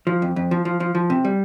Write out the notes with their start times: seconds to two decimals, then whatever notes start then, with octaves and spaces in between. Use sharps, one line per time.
0.07 F3
0.22 F2
0.36 F2
0.51 F3
0.65 F3
0.80 F3
0.95 F3
1.10 C3
1.25 G3